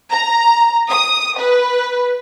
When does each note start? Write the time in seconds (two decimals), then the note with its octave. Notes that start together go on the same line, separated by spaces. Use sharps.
0.11 A#5
0.90 D#6
1.38 B4